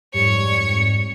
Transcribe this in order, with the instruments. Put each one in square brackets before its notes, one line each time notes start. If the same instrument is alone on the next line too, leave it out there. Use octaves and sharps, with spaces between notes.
[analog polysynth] F2 G#2 G3 [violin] C#5 C#6